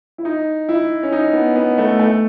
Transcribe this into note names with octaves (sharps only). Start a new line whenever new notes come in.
E4
D#4
E4
C#4
D#4
B3
B3
A3
A3